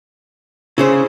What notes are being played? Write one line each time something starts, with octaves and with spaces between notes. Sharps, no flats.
C#3 E4 G#4 C5